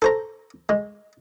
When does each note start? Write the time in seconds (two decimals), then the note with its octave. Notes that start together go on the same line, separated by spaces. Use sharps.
0.02 A4 C5 A#5
0.69 G#3